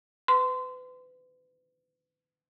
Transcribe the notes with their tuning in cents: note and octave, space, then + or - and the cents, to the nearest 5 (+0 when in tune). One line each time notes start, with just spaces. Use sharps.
B4 +35 C6 -25